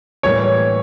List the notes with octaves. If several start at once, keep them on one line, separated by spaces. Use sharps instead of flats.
A2 E3 G3 A#3 C#5